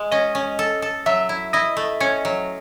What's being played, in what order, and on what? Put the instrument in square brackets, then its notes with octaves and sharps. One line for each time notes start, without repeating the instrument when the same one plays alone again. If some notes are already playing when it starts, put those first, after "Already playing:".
Already playing: [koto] G#3
[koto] C#4 [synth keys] D#5
[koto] C#4
A4
A4
[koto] F#3 [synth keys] E5
[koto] E4
[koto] E4 [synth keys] D#5
[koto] A3
[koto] C#4 [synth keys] C#5
[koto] F#3